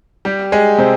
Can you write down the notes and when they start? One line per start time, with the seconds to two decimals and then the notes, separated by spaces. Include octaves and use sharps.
0.25 G3 G4
0.52 G#3 G#4
0.78 C3 C4